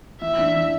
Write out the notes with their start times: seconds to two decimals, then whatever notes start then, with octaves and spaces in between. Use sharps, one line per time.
0.21 E3 E5
0.39 D4
0.56 E3